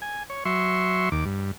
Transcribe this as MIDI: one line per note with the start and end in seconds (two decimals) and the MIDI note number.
0.02 0.23 80
0.30 0.44 73
0.45 1.09 54
0.45 1.09 76
0.45 1.09 84
0.45 1.09 85
1.12 1.25 39
1.12 1.25 86
1.25 1.52 43